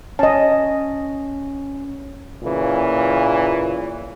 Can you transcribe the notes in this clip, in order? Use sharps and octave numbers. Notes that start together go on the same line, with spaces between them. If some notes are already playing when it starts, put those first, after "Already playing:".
C#4 D#5 A5
A#2 C#3 E3